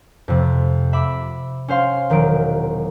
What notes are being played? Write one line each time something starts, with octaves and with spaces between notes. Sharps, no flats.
F2 C3
E5 B5 D6
C#4 C5 F5 C6
E1 D#3 F#3 D7